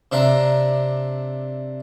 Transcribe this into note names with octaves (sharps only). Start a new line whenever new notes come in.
C3 D4 E5 A#5